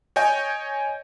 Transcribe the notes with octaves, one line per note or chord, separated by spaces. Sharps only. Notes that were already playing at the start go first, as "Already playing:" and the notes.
C#5 D#5 G5 G#5 G6